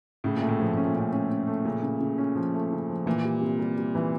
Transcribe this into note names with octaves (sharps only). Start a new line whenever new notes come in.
A2 C#3
A#2 A3
A2
A#2 F3
A2 C#4
A#2
A2 C#4
C#4
C#4
A3
A#2 C#3
C#3
C#3
C#4
F3
A3
C#3
F3
A#2 E3
G3
C3
G3
G3
E3